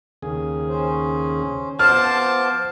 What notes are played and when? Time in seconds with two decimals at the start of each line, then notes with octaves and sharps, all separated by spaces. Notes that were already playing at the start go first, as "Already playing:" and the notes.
0.22 D#2 C#3 G#4
0.68 C#4 C5
1.79 F3 B3 C5 A5 D6 F6